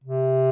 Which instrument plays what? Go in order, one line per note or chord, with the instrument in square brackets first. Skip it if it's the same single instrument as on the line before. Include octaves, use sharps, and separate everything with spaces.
[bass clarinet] C3